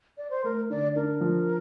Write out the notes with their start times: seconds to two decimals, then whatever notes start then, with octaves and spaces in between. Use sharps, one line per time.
0.17 D5
0.30 C5
0.44 A3 A#4
0.70 D3 D5
0.96 D4 A#4
1.21 F3